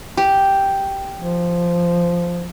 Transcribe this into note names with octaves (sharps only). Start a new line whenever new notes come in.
G4
F3